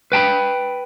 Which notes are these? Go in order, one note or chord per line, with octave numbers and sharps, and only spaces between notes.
B4 G5 A5 B5